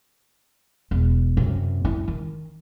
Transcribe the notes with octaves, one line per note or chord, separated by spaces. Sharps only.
E1
F#2 C3
E4
D#3